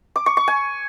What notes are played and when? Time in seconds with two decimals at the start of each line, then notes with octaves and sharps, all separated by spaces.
0.16 D6
0.26 C#6
0.37 C#6
0.48 G#5